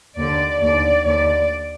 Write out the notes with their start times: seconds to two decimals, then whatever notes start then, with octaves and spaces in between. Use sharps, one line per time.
0.17 D#2 D3 D5
0.61 D#2 D3 D5
1.05 D#2 D3 D5